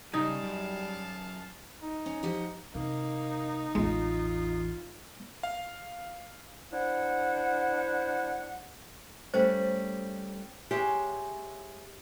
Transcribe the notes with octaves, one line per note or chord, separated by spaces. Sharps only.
C#3 G3 D#4 G#4 F5 A5
F#2
D#4
C#4
F3 G4 F#5
C3 A#3 D#4
A1 E2 G#3 F4
F5
D4 E4 C5 F#5
G3 A3 C#4 C5
G#3 G4 C#5 E5